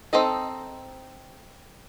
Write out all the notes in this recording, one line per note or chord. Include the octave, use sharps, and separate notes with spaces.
C4 D#4 A4 D#5